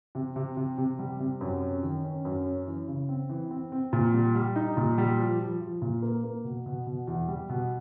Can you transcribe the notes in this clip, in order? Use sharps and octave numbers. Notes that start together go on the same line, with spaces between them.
C3
C3
C3
C3
G3
C3
F#2
C#4
D#3
C#4
F#2
C#4
E3
C#3
C4
E3
C4
C4
A#2
G3
G3
D#4
A#2
G3
F3
F3
F3
A#2
A#3
A#3
B2
B2
B2
E2
G3
B2